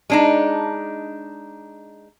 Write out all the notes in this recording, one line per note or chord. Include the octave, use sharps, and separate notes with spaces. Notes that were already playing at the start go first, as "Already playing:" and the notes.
G#3 D4 D#4